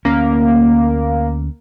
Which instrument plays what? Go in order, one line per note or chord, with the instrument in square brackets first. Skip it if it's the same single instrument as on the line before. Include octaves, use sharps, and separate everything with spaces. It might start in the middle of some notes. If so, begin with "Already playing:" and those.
[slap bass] D2 C#4 [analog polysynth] A#3